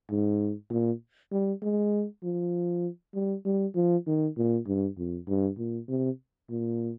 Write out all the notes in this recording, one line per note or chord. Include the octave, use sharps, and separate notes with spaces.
G#2
A#2
G3
G#3
F3
G3
G3
F3
D#3
A#2
G2
F2
G2
A#2
C3
A#2